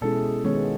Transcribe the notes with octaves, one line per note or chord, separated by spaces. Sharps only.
B2 G#3 C#4 E4 G#4 A4
D#3 G#3 B3 C#4